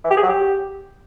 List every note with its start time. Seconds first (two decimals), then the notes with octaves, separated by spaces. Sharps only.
0.05 E3
0.11 G4
0.17 G#4
0.23 F#3
0.29 G4